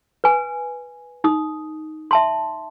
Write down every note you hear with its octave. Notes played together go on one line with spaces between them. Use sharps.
B4 G#5
D#4 D#6
E5 A5 C6